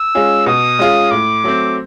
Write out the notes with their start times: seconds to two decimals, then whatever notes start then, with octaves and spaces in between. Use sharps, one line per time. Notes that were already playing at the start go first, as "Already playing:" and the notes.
Already playing: E6
0.15 G#3 C#4 F4 G#4
0.46 B2 D#6
0.79 G#3 C#4 F4 G#4
1.11 A2 D6
1.44 F#3 A3 C4